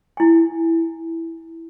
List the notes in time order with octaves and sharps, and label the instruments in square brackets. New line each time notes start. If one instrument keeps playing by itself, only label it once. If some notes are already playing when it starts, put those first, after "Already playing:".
[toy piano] E4 G#5